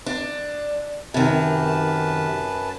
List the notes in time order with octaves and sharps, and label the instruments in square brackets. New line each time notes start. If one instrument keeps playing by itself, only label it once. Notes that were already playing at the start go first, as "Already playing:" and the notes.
[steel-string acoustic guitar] D4
[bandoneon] F#2 B4 A5 [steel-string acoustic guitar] C3 D#3